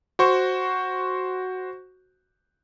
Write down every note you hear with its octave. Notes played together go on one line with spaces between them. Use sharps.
F#4 C5 C#6